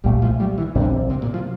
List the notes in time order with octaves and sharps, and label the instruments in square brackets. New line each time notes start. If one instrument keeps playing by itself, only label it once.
[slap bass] C2 A#2 A3 [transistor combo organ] G3
[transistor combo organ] F3
G3
E3
[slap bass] A#1 A#2 G3 C4 [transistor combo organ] D3
[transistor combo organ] C3
A#2
F3